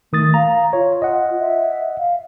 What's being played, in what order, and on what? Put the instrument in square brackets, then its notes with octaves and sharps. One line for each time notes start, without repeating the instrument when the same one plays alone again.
[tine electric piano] D#3 D#6 A6 [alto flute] A3
[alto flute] F5 [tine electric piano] A#5
[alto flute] F4 [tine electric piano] C#5
[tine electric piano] D#5 F#5
[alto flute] E5
F5